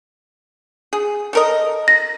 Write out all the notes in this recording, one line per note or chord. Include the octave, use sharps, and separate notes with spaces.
G#4
A4 A#4 D#5
A#6